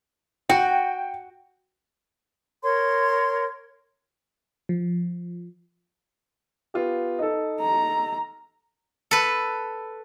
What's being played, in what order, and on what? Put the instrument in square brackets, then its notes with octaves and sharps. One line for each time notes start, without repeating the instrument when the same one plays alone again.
[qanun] F#4 [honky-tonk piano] G5
[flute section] A#4 C#5 C6
[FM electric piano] F3
[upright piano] B3 F4 G4
D#4 A4
[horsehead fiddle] A#5
[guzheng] A4 B4